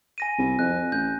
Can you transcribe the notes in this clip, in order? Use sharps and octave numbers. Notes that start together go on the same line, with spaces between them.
G#5 A#6 D#7
C2
F2 F#6
A1 G6